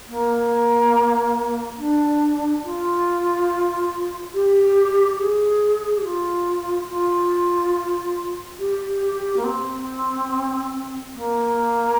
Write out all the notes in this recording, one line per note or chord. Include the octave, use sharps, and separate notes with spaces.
A#3
D4
F4
G4
G#4
G4
F4
F4
G4
A#3
C4
A#3